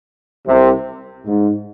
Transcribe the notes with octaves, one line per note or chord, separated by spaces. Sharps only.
C2 C3
G#2